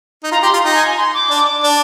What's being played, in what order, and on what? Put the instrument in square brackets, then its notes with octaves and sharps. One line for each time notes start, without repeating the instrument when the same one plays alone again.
[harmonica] D#4
[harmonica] F4 [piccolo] A#5
[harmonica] G4 [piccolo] C6
[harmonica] F4
[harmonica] D#4 [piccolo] A#5
[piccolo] G#5
G#5
C6
D6
[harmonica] D4
D4